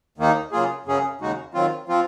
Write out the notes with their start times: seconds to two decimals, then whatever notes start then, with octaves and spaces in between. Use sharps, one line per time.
0.18 D#2 D#3 A#3 D#4
0.52 C#3 F#3 A#3 F4 G#4
0.86 F#2 C#3 F#3 C#4 G#4
1.21 D#2 C#3 G#3 D#4 F#4
1.54 D#3 F#3 C4 F4
1.88 F3 C4 F4